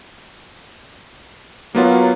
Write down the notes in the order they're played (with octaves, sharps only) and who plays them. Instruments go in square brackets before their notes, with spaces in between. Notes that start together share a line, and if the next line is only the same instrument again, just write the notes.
[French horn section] F#3 [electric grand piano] A#3 B3 F4